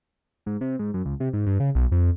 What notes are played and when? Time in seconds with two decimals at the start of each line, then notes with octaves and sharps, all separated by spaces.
0.46 G#2
0.61 C3
0.79 G#2
0.94 F#2
1.05 C#2
1.20 C3
1.33 G#2
1.47 G2
1.60 C#3
1.75 B1
1.92 F2